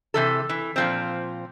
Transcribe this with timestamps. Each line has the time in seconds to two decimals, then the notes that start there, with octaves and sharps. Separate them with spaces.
0.14 C3 E3 A4
0.49 E3
0.76 A#2 F3 C4